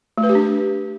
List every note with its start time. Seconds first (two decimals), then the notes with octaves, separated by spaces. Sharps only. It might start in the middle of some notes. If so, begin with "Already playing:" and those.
0.18 A3
0.23 B4
0.29 G4
0.35 D4